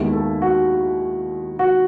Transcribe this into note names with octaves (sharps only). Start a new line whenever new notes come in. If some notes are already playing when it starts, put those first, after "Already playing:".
Already playing: D#2 D#3 G#3 B3 E4
A4
F#4
F#4